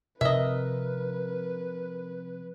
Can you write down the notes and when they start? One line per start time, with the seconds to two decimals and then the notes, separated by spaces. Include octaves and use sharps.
0.21 C3 F3 C4 A#4 B4 D#5 E5